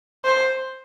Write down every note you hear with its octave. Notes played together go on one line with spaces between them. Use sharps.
C5